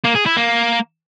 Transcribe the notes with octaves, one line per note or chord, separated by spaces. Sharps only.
A#3
G#4
E4
A#3